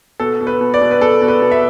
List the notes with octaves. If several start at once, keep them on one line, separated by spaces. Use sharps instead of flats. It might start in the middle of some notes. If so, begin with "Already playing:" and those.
B2 A4
B2
B4
B2
D5
B2
B4
B2 A4
B2
B4
B2
E5